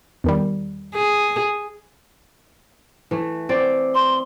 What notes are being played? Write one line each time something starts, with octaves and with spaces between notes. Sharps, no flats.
E2 D#3 G3
G#4
E3 A3
C4 D5
C6